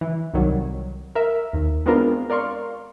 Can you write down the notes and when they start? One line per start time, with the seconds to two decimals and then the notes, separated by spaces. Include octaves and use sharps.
0.01 E3
0.34 C2 D#3 F#3 G3
1.15 A#4 E5
1.53 D#2
1.86 G#3 B3 C4 D4 F4 A#4
2.30 A#4 D5 F5 C6 C#6